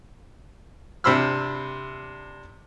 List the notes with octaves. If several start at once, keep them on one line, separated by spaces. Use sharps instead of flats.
C3 D4 C5 B5 E6 F6